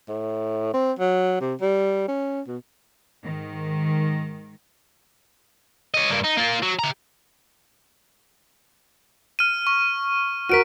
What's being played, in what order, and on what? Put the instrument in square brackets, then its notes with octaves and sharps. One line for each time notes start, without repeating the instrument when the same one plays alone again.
[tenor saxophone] A2
C4
F#3
C3
G3
C#4
B2
[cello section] G#2 D#3
[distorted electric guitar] C#5 D#5
G2 A#3
D#4
A#3 F4
F#3
G4 A#5
[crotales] F6 D#7
C#6
[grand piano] F#4 A#4 [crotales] B6 D7 D#7